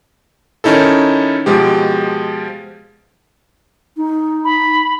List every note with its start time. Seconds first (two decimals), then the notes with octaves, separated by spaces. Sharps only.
0.64 D#3 C#4 D#4 E4 A4
1.46 B2 F3 G#3 G4
3.97 D#4
4.44 B5